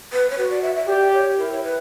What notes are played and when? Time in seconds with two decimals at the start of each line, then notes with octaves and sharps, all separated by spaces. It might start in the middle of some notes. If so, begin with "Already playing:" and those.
0.13 B4
0.30 C#5
0.38 F#4 B4
0.50 D5
0.62 E5
0.76 E5
0.88 G4 D5
1.13 C#5
1.38 E4 A#4
1.52 C#5
1.64 B4